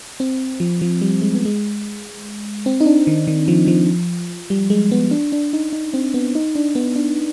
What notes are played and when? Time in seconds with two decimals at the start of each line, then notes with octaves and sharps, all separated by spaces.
0.20 C4
0.60 F3
0.81 F3
1.01 G3
1.22 G#3
1.34 B3
1.45 G#3
2.66 C4
2.80 D#4
2.86 D4
3.07 D#3
3.27 D#3
3.48 F3
3.68 F3
4.50 G3
4.70 G#3
4.91 B3
5.11 D4
5.32 D4
5.53 D#4
5.73 D#4
5.94 C4
6.14 B3
6.35 D#4
6.55 D4
6.75 B3
6.96 D4